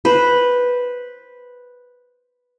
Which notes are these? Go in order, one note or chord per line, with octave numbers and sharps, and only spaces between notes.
B4 C5